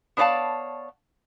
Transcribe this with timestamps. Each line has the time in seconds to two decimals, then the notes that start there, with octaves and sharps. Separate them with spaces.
0.17 B3 D4 C#5 D5 F5 A5